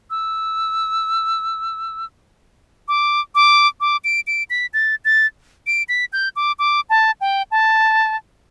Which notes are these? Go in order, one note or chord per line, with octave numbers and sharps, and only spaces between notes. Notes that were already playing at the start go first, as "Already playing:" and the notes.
E6
D6
D6
D6
D7
D7
B6
A6
A6
D7
B6
G6
D6
D6
A5
G5
A5